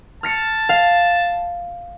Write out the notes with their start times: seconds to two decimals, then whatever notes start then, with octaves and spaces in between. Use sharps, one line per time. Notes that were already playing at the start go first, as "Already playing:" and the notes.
0.23 A5 F6 A#6 C#7
0.69 F5